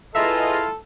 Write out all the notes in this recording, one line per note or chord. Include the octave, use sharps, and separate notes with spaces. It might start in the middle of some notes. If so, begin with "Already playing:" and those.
E4 F4 G#4 A4 B4 D#5 E5 A#5